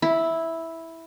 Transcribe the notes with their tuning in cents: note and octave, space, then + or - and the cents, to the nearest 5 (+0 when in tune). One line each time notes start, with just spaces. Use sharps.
E4 -5